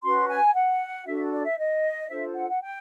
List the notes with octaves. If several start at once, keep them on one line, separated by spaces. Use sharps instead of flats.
C#4 F#4 B4 C6
G#5
F#5
D4 F#4 A4 E5
D5
E5
D#5
D4 F4 A4 C5 E5
F#5
F#5
G5